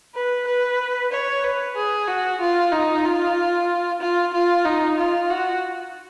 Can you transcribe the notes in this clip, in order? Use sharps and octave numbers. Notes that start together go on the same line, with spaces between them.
B4
B4
C#5
B4
G#4
F#4
F4
D#4
F4
F4
F4
D#4
F4
F#4